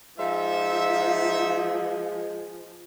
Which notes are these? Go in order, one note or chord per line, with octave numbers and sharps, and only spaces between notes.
F3 G#3 D#4 C5 E5 F5